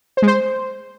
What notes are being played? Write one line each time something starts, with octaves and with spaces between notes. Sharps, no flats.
C5
G#3
C5